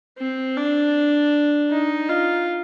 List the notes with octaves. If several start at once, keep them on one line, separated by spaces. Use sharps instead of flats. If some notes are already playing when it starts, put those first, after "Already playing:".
C4
D4
D#4
F4